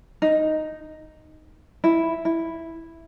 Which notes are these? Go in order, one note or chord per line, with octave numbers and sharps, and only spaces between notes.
D#4
E4
E4